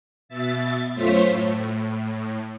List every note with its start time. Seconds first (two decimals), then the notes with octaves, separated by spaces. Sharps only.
0.29 B2 E5 A6
0.94 F#2 A3 F4 C5 C#5 B6
1.26 A2